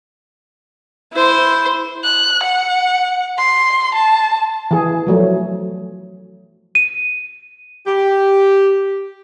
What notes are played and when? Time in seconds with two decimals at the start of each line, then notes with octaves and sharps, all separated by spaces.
1.12 E4 C5
2.04 F#6
2.43 F#5
3.38 C6
3.95 A5
4.71 E3 G#4
5.07 F3 F#3 A3
6.75 D#7
7.86 G4